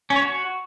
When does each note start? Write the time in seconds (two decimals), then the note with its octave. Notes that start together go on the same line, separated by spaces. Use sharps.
0.10 C#4
0.16 C#5
0.22 F#4